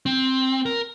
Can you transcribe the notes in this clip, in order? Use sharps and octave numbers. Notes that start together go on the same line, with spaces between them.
C4
A#4